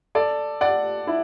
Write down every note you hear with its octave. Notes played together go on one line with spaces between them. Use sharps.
A4 D5
D5 F#5
E4